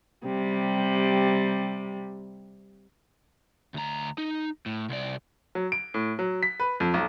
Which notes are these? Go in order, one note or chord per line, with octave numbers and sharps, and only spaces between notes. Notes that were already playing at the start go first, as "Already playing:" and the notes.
C3 G3
D2 A#5
D#4
A2
C2 D5
F#3
D7
A2
F#3
B6
B4
F2
B1